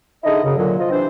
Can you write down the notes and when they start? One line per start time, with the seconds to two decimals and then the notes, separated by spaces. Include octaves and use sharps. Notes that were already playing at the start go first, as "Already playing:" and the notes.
0.24 D3 D#4 E4 G#4 D#5
0.43 F#2 C#3
0.57 A#2 D3 F#3
0.78 F3 F4 D#5
0.91 C3 E3 C4 D4 C5